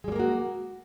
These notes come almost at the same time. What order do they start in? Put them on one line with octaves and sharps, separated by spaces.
G#3 G3 A#3 A#4 F#4